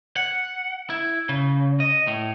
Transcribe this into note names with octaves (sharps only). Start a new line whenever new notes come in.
F#5
E4
C#3
D#5
A2